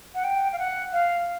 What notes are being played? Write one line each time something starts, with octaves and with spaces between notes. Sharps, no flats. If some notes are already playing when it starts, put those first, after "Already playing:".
F#5
G5
F5
F#5
F5